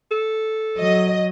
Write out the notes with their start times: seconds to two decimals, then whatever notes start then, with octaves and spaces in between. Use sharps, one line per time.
0.11 A4
0.79 F#3 D#5